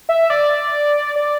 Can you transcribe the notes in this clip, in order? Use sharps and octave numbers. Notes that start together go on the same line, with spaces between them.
E5
D5
D5